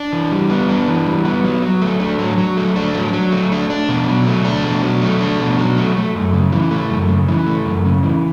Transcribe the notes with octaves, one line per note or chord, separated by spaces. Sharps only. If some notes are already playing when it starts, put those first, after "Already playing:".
Already playing: D4
E3
G3
B3
D4
E3
G3
B3
F#3
F#3
A3
D4
F#3
F#3
A3
D4
F#3
F#3
A3
D4
D4
B2
F#3
A3
D4
B2
F#3
A3
D4
B2
F#3
A3
A3
F#2
C#3
E3
A3
F#2
C#3
E3
A3
F#2
C#3
E3